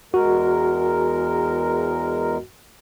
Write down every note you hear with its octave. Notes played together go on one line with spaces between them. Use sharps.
E2 G#3 F#4 A#4